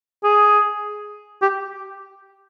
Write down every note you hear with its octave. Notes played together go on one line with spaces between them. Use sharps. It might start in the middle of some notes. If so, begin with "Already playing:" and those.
G#4
G4